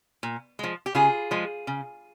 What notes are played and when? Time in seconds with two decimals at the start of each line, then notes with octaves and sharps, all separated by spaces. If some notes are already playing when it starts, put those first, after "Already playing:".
0.23 A#2
0.59 F3 G#3
0.86 G4
0.95 C#3 F4 G#4
1.31 F3 G#3
1.67 C#3